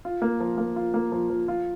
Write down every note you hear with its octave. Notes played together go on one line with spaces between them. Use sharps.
F4
A#3
F3
A#3
F4
A#3
F3
F3
F4